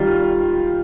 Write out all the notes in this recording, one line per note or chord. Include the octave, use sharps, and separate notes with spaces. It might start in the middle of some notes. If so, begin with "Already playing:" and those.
Already playing: D#3 G3 F4